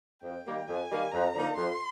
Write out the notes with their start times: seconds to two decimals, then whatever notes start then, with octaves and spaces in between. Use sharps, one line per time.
0.23 F2 G5
0.45 D#3 G3 A#3
0.68 F2 G#5
0.89 D#3 G3 A#3
1.12 F2 A#5
1.34 D3 F3 A#3 D#4
1.57 F2 C6